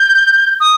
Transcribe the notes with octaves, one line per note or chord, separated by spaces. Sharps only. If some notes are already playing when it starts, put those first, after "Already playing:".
Already playing: G6
D#6